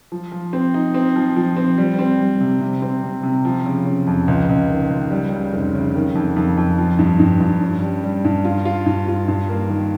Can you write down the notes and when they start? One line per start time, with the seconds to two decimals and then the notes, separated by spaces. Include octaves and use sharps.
0.12 F3
0.32 F3
0.53 C4
0.74 D#4
0.94 C4
1.16 F3
1.36 F3
1.56 C4
1.78 G3
1.99 C4
2.19 G3
2.41 C3
2.61 C3
2.82 C4
3.03 C3
3.23 C3
3.45 F3
3.66 C#3
3.86 C#3
4.07 F2
4.28 C#2
4.49 C#2
4.70 D#3
4.90 C#2
5.11 G3
5.32 C#3
5.53 F1
5.75 C#3
5.95 D#3
6.15 F2
6.36 F2
6.57 F2
6.78 F3
6.99 G2
7.19 G2
7.41 G2
7.61 C#4
7.82 G3
8.04 G3
8.25 G2
8.45 F4
8.65 F4
8.86 G2
9.08 F4
9.28 G2
9.49 A#3
9.70 D#3